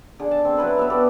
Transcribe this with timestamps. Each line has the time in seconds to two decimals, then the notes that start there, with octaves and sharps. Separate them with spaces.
0.20 D3 G#4
0.31 A5
0.45 C4
0.57 F#3 E4 B4 F#5
0.77 B3 E5 F5
0.90 G4 A4 B4 D5